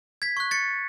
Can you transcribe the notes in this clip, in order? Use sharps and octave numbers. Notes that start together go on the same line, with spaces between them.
G#6 B6
C#6 F#6
A6 C#7